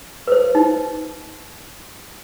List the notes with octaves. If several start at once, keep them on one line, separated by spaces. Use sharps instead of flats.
B4 C5
D#4